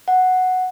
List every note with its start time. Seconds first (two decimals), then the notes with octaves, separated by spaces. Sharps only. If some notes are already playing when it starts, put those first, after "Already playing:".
0.08 F#5